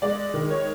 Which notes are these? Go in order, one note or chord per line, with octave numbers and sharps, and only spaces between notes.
G#3 D5
D#3
C#5